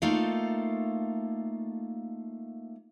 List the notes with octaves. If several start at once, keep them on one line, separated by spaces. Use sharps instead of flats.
A3 A#3 D#4 F4 A4 F5